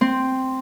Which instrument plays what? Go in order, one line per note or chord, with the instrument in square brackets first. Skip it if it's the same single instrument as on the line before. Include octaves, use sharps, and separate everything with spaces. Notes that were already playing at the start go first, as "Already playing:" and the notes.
[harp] C4